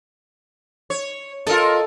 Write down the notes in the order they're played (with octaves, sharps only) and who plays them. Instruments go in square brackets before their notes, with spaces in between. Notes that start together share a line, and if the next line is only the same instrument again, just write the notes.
[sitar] C#5
[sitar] F4 A#4 D#5 [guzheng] A4